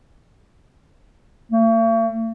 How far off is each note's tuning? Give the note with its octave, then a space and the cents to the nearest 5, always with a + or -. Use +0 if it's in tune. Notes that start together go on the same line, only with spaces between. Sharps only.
A3 +45